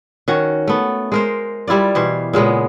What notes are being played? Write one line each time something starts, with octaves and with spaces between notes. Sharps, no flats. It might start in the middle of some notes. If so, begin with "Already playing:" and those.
D#3 C#4 F#4
A3 B3
G#3 A#4 C5
G3 E4 F4 D5
B2 E3 C5
A#2 C#3 G#3 B3